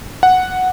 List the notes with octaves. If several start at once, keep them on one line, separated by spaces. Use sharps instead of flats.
F#5